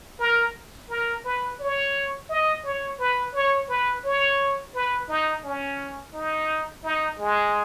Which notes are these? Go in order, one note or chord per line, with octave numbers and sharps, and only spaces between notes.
A#4
A#4
B4
C#5
D#5
C#5
B4
C#5
B4
C#5
B4
D#4
C#4
D#4
D#4
G#3